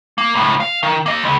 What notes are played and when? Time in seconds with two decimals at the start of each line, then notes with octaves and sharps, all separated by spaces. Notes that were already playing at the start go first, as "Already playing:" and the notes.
0.18 A#3
0.35 C#2 A2
0.60 F5
0.83 D#3
1.06 A#3 D#5
1.23 C#2